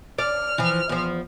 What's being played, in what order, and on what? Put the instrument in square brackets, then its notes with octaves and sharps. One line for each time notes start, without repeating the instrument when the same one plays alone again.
[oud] D5 [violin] F6
[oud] E3 F3
E2 F3